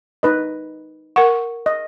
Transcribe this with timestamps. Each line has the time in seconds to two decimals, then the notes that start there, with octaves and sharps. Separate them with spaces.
0.23 D#4 B4 D#5
1.16 A#4 F#5 C#6
1.66 D#5